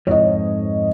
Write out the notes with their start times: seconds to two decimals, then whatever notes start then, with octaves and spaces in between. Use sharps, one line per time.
0.07 F2 G#2 C#5 D#5